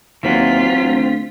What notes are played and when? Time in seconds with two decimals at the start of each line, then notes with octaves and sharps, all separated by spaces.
0.23 D#2 E3 F#3 C4 F4 B6
0.83 D2